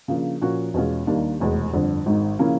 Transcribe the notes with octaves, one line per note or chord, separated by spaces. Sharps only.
C#3 F3 A#3 D4 F4
A#2 F3 A#3 C#4 F#4
E2 B2 G#3 C#4 F4
D#2 D#3 G3 A#3 D4
F1 E2 B2 G#3
G1 F2 D3
G#1 G#2 D#3
C#3 F3 A#3 C#4 E4